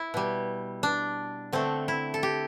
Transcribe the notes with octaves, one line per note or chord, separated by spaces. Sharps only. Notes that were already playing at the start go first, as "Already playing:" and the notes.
Already playing: E4
B2 G3
D4
D3 A3 C4
E4
A4
G4